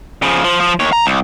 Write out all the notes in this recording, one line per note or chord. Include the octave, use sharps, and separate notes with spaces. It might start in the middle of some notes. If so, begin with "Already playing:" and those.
C#3 F3
F3
F3
D#2 C#5
A#5
C2